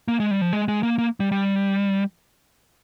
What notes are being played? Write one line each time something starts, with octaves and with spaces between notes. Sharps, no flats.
A#3
G#3
G3
F3
G#3
G#3
A#3
A#3
G3
G3